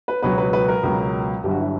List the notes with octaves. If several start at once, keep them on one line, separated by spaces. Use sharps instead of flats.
B4
C#2 B2 F#3 B4
B4
B4
A#4
C#2 B2 F#3
G1 G2 D3 F#3 G4
F#4
E4